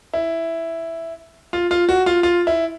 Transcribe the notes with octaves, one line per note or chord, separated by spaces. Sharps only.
E4
F4
F4
F#4
F4
F4
E4